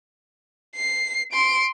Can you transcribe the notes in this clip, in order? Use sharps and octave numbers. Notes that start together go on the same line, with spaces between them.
C7
C6 D7